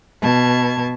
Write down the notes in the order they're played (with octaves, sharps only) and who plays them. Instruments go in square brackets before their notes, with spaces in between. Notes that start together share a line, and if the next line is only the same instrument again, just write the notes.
[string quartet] B2 A5 G#6